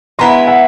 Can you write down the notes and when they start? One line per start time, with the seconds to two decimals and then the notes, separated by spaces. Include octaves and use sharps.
0.19 G#3 B3 E4 A#5 C6
0.47 E5 F#5